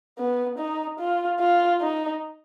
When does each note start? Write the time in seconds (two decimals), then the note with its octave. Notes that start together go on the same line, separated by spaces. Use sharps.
0.18 B3
0.59 D#4
0.99 F4
1.40 F4
1.81 D#4